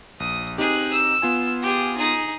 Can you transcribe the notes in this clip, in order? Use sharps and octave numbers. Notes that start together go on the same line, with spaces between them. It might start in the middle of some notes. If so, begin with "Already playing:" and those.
A#1 D#6
C4 D#4 G4 G#4 F#6
E6
B3 F4 G#5
G4 G#4
D#4 G#4